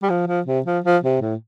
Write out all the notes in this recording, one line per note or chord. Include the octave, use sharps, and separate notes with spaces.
G3
F3
F3
C3
F3
F3
C3
A2